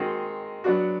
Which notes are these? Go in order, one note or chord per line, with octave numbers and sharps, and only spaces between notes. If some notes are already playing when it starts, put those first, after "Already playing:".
Already playing: D#3 G#3 C4 D#4 F#4
F#3 B3 D4 F#4